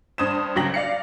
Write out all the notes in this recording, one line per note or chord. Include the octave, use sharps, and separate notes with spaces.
G2 C5 D#6 G#6 E7
G1 C#3 F#3 G5 A#6 F#7
D5 F5 C7 C#7